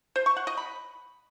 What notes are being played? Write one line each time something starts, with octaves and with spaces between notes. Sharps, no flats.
C5
C#6
F#5
D#5
B5